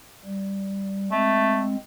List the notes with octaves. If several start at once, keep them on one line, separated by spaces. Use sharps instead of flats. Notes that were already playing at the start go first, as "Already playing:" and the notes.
G3
G#3 A3 C4